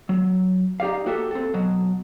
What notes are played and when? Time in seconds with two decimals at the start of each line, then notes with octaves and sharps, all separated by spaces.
0.09 F#3
0.80 D#4 G4 D5 F5
1.06 A#3 F#4 G4 A4 E5
1.31 C4 A4
1.54 B2 F#3